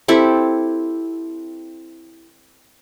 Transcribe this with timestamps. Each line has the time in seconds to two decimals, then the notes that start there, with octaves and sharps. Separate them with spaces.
0.08 C4 E4 G4 A4